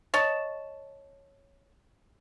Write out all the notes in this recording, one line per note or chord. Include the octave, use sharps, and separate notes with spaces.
C#5 D#5 A5